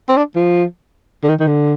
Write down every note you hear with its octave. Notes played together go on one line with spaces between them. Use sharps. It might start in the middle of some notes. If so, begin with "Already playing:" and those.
C4
D4
F3
D3
D#3
D#3
D3